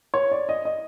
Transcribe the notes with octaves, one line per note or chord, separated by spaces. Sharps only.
C#5
D5
D#5
D#5